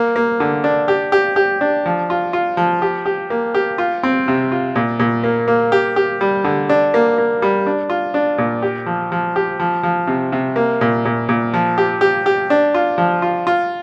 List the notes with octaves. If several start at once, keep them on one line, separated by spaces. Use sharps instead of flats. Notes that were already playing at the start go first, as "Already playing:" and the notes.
Already playing: A#3
A#3
D3
D4
G4
G4
G4
D4
F3
F4
F4
F3
G4
G4
A#3
G4
F4
C4
C3
F4
A#2
A#2
A#3
A#3
G4
G4
G3
D3
D4
A#3
A#3
G3
D4
F4
D4
A#2
G4
F3
F3
G4
F3
F3
C3
C3
A#3
A#2
A#2
A#2
F3
G4
G4
G4
D4
F4
F3
F4
F4